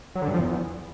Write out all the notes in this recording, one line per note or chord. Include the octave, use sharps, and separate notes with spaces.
F#3
D3
G2
F3
E2